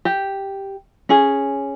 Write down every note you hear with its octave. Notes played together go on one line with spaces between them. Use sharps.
G4
C#4 G#4